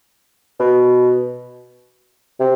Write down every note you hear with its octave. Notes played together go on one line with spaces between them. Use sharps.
B2
C3